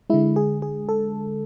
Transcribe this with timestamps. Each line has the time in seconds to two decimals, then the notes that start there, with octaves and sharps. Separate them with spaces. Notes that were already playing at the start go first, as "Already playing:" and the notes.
0.10 D3 G#3 E4
0.36 G#4
0.62 G#4
0.89 A4